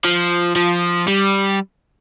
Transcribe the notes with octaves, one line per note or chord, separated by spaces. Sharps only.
F3
F3
G3